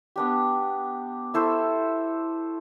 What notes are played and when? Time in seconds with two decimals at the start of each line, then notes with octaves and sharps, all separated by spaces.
0.16 B3 D4 G4
1.34 E4 A4 C5 C#6